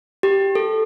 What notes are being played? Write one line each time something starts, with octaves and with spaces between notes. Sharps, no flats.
G4
A4